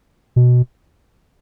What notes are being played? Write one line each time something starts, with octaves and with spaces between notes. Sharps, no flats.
B2